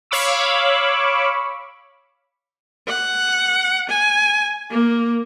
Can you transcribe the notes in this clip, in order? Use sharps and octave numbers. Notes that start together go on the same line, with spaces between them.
C#5 F5 B5 C#6 D6 E6
F#5
G#5
A#3